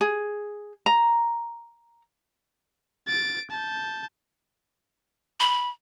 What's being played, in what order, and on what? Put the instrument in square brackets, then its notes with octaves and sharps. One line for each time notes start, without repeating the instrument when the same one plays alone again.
[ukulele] G#4
A#5
[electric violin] A6 D7
A5 G6
[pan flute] B5